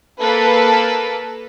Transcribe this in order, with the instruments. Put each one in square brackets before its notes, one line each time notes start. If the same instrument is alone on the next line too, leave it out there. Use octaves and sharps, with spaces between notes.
[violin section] A#3 A4 B4